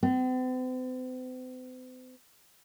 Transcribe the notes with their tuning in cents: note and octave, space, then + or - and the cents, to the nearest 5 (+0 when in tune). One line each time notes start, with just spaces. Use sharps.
C4 -45